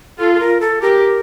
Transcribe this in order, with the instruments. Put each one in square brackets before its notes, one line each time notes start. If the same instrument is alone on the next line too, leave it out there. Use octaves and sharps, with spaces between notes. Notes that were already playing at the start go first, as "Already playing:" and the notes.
[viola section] F4 [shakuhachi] A4
[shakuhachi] A4
A#4
A4
[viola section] G4 [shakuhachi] A#4